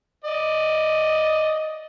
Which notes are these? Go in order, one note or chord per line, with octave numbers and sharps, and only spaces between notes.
D5 D#5